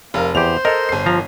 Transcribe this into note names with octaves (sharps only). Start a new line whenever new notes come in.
F1 A#4 F5
E2 G4 C5 F7
A4 A#4 D#5
G1 C7
F3 A#5